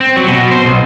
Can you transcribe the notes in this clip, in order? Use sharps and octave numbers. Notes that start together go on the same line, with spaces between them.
C4
F#3
B2
C5
B1